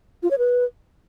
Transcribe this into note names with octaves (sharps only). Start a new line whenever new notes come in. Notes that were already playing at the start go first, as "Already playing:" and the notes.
F4
C#5
B4